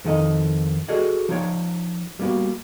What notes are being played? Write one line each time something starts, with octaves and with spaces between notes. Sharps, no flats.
F2 D#3 A4 D#5
F#4 G#4 A4 D5 D#5
F3 D#4 C#5 D5
G3 A#3 B3 F#4